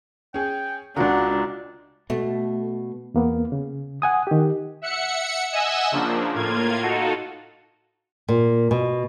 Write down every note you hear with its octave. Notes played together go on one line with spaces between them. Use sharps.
C#4 G#4 G5
C#2 C#3 D4 F4 F#4 A#4 F#5
B2 A3
E2 A#3 B3
C#3
F#5 G#5 D#6
D#3 G4
E5 F#5 C#7
D#5 E5 F#5 G#5 E6
C#3 F3 A#3 D4
A2 A#3 F4 G#6
D#4 F4 F#4 A4
A#2
B2